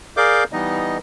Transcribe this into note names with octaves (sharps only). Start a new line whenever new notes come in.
G#4 A#4 D5 F5 D6 G6
E3 G3 B3 D#4 D#5